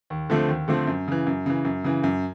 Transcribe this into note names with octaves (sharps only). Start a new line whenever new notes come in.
D#2
D3 F3 A3 C4
D#2
D3 F3 A3 C4
F#2
C#3 E3
F#2
C#3 E3
F#2
C#3 E3
F#2